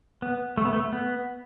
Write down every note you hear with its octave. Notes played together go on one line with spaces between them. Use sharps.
B3
A3
B3
A3
B3